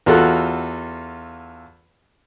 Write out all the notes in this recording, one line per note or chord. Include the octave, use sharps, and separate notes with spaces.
E2 F4 F#4 A4 F#6